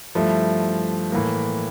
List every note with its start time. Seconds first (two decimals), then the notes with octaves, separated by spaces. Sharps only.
0.15 G2 F3 A3 E4
1.12 A2 E3 A#3